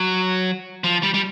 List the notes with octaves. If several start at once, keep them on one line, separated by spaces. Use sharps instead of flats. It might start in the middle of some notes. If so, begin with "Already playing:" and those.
Already playing: F#3
F3
G3
G3